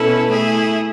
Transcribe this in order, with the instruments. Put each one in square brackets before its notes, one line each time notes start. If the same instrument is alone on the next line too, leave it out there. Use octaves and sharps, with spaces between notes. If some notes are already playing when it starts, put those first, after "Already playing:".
Already playing: [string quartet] B2 C#4 E4 B4 [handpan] A4
[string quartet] A3 E4 G#4